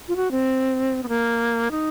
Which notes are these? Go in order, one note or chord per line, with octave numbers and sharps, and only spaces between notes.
F4
F#4
C4
B3
A#3
D#4